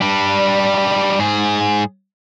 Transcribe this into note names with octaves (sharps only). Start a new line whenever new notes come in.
G3 D4
G#2 G#4